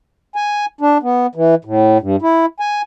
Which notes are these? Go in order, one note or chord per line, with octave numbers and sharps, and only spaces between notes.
G#5
D4
B3
E3
A2
G2
E4
G#5